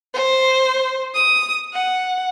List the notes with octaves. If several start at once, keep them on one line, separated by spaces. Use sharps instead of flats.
C5
D#6
F#5